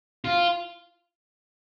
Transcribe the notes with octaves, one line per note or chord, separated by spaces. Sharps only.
F4